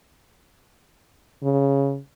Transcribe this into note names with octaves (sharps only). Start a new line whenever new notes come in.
C#3